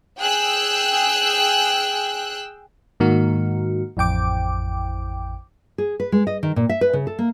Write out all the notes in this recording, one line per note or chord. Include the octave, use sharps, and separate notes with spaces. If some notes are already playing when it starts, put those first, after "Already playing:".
G#4 G5 E6 F#6
G#2 D#3 A#3 F#4
A1 F2 G5 D6
G#4
B4
G#3
D#5
D#3
A#2
E5
B4
C#3
A4
A#3